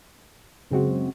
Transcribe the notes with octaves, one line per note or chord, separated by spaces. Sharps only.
F#2 C#3 G#3 C4 F#4